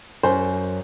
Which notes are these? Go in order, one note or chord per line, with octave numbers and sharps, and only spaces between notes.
F#2 C5